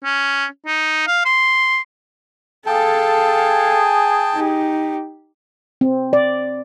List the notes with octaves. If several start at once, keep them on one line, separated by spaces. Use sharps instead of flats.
C#4
D#4
F5
C6
G#4 A4 F5 G5 A5
D#4 G4
C4
D5